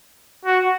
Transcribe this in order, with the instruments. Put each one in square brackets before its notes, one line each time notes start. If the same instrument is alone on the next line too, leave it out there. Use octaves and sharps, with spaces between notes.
[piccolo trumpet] F#4